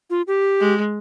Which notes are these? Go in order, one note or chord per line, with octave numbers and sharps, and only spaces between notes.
F4
G4
G#3